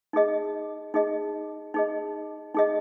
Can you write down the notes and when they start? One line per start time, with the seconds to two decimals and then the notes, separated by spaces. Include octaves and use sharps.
0.13 D#4 G#4 D#5
0.94 D#4 G#4 D#5
1.74 D#4 G#4 D#5
2.54 D#4 G#4 D#5